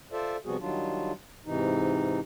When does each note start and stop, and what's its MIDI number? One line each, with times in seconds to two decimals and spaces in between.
0.12 0.37 65
0.12 0.37 69
0.12 0.37 72
0.12 0.37 74
0.12 0.37 76
0.45 0.56 48
0.45 0.56 53
0.45 0.56 55
0.45 0.56 59
0.45 0.56 66
0.45 0.56 68
0.60 1.12 51
0.60 1.12 54
0.60 1.12 55
0.60 1.12 62
0.60 1.12 65
1.46 2.20 44
1.46 2.20 48
1.46 2.20 52
1.46 2.20 63